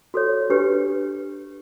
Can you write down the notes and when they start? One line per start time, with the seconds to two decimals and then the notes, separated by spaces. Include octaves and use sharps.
0.14 F#4 A4 C#5
0.50 D4 G4 B4